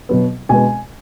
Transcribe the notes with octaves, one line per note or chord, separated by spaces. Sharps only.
B2 F#3 B3
B2 G#3 B3 G#5